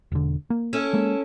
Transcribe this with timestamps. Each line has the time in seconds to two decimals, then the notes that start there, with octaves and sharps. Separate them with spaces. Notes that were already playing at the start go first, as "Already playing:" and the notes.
0.12 E1 D3
0.50 A#3
0.73 C#4 E4 A4
0.93 G#3 A#3